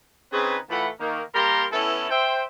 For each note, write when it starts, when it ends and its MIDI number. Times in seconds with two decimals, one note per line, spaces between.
0.32 0.57 49
0.32 0.57 60
0.32 0.57 63
0.32 0.57 68
0.32 0.57 71
0.70 0.88 45
0.70 0.88 52
0.70 0.88 57
0.70 0.88 65
0.70 0.88 78
0.70 0.88 83
1.00 1.22 51
1.00 1.22 58
1.35 1.65 55
1.35 1.65 58
1.35 1.65 67
1.35 1.65 70
1.35 1.65 82
1.35 1.65 84
1.72 2.11 52
1.72 2.11 59
1.72 2.11 61
1.72 2.11 64
1.72 2.11 69
2.11 2.43 72
2.11 2.43 76
2.11 2.43 79